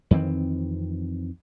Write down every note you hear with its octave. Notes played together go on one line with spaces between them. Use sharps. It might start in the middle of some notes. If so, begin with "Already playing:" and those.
F2 D#3 E3 C4